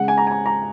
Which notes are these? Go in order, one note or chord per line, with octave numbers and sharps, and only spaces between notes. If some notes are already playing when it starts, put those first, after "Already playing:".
Already playing: C#3 G#3 F#5
G#5
A#5
G#5
A#5
A#5